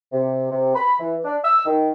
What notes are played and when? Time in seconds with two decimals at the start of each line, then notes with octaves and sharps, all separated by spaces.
0.12 C3
0.51 C3
0.75 B5
1.00 E3
1.25 D4
1.44 E6
1.66 D#3